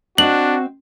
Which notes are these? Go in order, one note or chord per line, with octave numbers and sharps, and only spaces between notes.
C4 D4 F#4 D#5 F#7